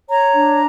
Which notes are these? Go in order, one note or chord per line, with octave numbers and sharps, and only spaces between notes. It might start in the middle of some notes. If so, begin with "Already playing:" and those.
C#5 A#5
D4